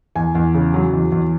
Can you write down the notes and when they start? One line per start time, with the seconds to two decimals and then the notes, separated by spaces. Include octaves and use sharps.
0.15 E2 G#5
0.35 E2
0.54 C#3
0.74 F#3
0.93 E2
1.12 E2